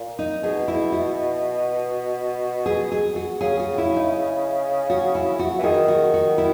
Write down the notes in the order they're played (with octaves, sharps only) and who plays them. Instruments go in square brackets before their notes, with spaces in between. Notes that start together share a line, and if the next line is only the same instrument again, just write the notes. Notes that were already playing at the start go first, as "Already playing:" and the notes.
Already playing: [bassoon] A#2
[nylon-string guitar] D#4
[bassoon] B2 [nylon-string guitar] G#4
[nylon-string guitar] E4
F#4
G#4
G#4
F#4
[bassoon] C#3 [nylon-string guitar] G#4
[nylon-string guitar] F#4
E4
D#4
F#4
E4
F#4
[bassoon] E3
[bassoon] D#3 [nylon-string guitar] G#4
[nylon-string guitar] F#4
F#4
E4